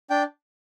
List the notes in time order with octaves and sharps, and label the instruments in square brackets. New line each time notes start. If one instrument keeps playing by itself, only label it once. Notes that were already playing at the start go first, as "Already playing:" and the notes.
[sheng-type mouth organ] D4 G5